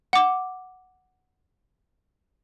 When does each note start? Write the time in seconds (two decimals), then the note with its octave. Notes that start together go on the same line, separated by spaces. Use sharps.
0.13 F#5 D6